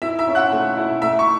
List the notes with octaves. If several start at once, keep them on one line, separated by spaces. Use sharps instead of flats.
E4 E5 E6
E5 E6
C#4
F#5 F#6
A3
E4
A3 E5 E6
C#6